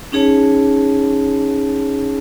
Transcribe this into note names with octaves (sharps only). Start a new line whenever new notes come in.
C#4 D#4 G#4 C#5 A5